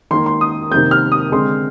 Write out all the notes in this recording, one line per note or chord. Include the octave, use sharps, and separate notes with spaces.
D#3 A#3 C6
C6
D#6
C3 D#3 A#3 G6
F6
D#6
D3 G#3 C4 C6